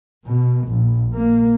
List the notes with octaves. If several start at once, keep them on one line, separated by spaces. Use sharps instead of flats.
B2
A#1
A#3